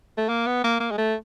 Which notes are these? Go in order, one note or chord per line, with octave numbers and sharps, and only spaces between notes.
A3
A#3
B3
A#3
A#3
G#3
A3